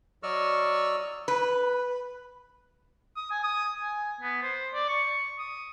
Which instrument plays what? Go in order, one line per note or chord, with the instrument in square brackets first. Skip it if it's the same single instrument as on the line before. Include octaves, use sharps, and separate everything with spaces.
[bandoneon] F#3 D5 D#5 C#6 E6 F6
[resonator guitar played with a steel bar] B4
[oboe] D#6
G#5
D#6
G#5
B3
C5
D5
C#6
D#6